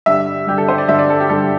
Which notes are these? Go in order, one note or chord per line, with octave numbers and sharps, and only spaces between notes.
G2 D3 G3 E5
G2 D3 G3 G4
A4
C5
D5
G2 D3 G3 E5
D5
A4
G4
G2 D3 G3 A4